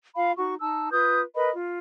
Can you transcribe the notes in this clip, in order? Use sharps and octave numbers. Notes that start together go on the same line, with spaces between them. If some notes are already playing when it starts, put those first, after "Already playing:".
F4 F5 B5
D#4 F#4 C#6
D#4 A5 E6
F4 B4 D#6 G6
A#4 B4 D#5 B5
F4